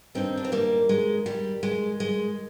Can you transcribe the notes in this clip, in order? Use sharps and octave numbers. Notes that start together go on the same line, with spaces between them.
G2 D#3 C4 D#4
D4
C4
G3 A#3
G#3
G3
G#3
G#3